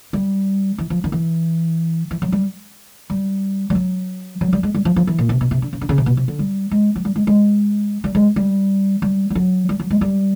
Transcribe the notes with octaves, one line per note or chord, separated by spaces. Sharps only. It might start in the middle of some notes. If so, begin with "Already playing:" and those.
G3
E3
F3
D#3
E3
E3
F#3
G3
G3
G3
F#3
F#3
G3
G#3
G3
F3
F3
E3
A#2
C3
B2
C3
D3
C#3
D3
C#3
C3
B2
C3
D3
G3
G#3
F#3
G3
G#3
G#3
G3
G#3
G3
G3
G3
F#3
G3
F#3
G#3
G3